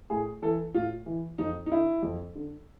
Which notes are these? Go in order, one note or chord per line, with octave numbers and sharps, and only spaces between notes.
A2 G#4
E3 A4
A2 F4
E3
F2 D#4
D#4
D3 E4
F2
D3